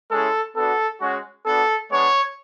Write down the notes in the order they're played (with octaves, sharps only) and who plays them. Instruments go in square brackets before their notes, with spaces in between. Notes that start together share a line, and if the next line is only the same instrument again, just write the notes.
[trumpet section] G#3 C#4 E4 A4
B3 D4 F#4 A4
G#3 C#4 F#4
B3 D4 F#4 A4
G#3 B3 D4 C#5